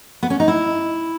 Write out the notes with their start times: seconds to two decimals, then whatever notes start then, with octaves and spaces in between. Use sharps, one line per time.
0.23 B3
0.30 C#4
0.40 D#4
0.48 E4